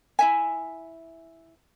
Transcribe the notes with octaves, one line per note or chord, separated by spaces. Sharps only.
E4 E5 G#5